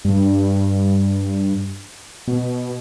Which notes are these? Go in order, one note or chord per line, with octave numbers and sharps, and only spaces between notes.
G2
B2